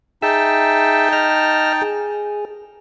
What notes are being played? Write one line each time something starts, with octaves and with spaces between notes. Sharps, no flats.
D#4 G#4 E5 G5 A5 E6
D#5 F6 A#6
G#4